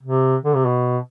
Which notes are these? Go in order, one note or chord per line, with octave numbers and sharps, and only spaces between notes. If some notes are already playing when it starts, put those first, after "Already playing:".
C3
D3
C3
B2